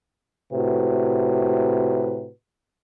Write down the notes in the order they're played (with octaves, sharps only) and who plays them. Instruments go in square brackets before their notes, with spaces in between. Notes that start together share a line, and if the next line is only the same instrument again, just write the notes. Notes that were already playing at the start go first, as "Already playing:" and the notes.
[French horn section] A2 C3 F#4 B4